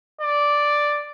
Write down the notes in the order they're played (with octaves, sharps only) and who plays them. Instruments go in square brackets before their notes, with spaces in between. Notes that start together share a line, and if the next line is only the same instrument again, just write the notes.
[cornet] D5